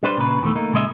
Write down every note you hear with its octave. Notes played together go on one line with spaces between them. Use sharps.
G3 D4 B4 C5
A#2 C#3 B4
E2 D#3 F3 A3
A3 A#3 D#4
A#2 C#3 G#3 D#5 E5